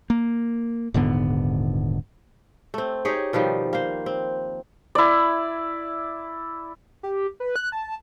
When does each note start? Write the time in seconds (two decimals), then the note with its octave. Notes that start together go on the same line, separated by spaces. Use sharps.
0.10 A#3
0.94 D#1 G#2 D3 B3
2.74 A3 C4
3.05 D#4 G4 G#4 C#5
3.33 B2 D#3 F3 G3
3.73 A#3 C5
4.06 C4
4.95 E4 D5
7.03 G4
7.40 B4
7.56 F#6
7.72 A5